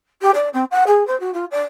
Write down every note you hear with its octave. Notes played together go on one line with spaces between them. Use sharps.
G4
D5
C4
F#5
G#4
C5
F#4
F4
D5